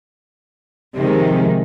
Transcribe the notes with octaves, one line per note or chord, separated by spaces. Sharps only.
C3 D#3 F3 G#3